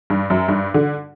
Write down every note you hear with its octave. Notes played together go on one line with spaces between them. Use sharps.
G2
F#2
G2
D3